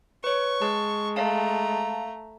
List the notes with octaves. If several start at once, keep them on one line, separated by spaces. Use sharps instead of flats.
B4 C#5 C#6
G#3 A5
A3 F5 A5 A#5